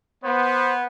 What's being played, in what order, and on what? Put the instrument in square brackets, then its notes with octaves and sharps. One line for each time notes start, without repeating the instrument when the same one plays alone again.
[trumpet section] B3 [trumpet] C5